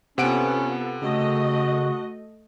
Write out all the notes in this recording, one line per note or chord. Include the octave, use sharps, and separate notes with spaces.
C3 B3 C#4 F4 A4 F#5 D7
C#3 A3 F#4 D#5